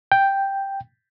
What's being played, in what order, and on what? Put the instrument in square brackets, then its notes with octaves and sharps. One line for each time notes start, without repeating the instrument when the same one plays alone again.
[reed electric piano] G5